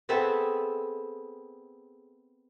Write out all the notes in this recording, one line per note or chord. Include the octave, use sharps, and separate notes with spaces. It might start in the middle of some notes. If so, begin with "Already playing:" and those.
B3 C4 G#4 A4 E5